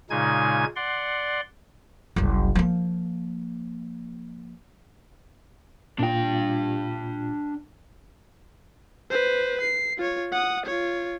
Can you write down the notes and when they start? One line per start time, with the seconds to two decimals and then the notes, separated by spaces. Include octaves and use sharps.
0.10 A#2 C#3 G#3 D#4 G#5 G#6
0.76 D5 F#5 C6
2.16 F#1 C2
2.55 F3 A#3
5.99 A#2 D4 F4 G5
9.10 B4 C5
9.61 C7
9.97 F4 C#5
10.32 F#5 D#6
10.66 F4 C#5